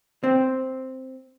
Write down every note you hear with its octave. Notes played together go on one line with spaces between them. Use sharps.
C4